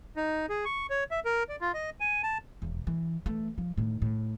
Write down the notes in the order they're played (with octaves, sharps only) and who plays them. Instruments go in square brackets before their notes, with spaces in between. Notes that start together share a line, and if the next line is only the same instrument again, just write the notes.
[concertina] D#4
G#4
C#6
C#5
E5
A#4
D5
F4
D#5
G#5
A5
[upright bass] E1 E2
E3
E3 A3
F3
A2 D#3
A2